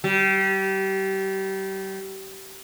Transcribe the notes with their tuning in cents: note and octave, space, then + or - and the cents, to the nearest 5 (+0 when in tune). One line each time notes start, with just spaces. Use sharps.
G3 -30